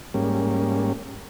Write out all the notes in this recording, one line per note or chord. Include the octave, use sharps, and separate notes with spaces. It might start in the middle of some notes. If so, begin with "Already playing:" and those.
G#2 G3 A#3 C#4